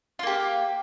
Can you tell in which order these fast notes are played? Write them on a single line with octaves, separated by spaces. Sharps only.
F4 A#3 G4